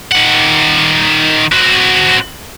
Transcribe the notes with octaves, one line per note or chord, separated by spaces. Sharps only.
D#3 F#5
C4 F#4